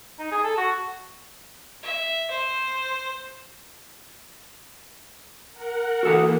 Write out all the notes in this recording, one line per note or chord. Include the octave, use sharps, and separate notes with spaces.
D#4
G#4
A4
F#4
E5
C5
A#4 F#5
E3 A#3 F#4 A4 F#5